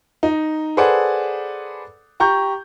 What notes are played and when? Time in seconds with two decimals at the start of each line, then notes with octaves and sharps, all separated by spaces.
0.23 D#4
0.77 G#4 A4 B4 C5 D5 F#5
2.20 G4 A#5 C#6 G6